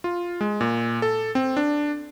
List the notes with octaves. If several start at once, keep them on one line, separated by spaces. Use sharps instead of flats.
F4
G#3
A#2
A4
C4
D4